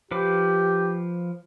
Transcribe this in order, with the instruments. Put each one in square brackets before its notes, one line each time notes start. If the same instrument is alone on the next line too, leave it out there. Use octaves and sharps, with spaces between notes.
[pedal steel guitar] F3 B4 D6 [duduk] G4